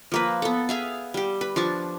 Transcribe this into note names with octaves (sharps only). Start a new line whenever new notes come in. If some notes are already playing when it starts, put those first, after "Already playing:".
F3 A#3 B4
B3 A4
G#4 E5 F5
G3 G4
B4
F3 D4 A5 C#6